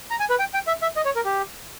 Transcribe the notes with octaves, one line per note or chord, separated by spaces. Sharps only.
A#5
G#5
B4
G5
G5
E5
E5
D#5
C#5
A#4
G4